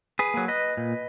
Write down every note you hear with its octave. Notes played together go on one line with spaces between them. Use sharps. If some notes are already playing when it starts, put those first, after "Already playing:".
G#4 B4
F#3 A#3
B4 D#5
A#2